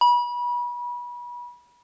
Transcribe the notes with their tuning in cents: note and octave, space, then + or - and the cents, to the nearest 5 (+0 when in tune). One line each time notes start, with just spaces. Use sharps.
B5 -30